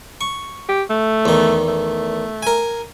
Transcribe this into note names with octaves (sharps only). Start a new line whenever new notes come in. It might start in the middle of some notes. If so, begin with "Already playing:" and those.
C#6
G4
A3
E2 D#3
A3
A#4 G#5